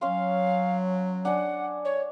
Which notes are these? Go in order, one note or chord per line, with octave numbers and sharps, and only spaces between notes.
F#3 C#4 F5 C6
D4 F#5 G#5
C#5